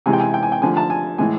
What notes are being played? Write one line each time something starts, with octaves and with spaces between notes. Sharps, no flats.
C3 E3 G#3 G#5
G5
G#5
G5
G#5
G5
D3 F3 A3 G#5
A5
G#5
A2 E3 G#3 G#5